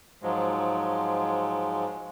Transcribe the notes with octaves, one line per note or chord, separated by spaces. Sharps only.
G#2 F3 F#3 G#3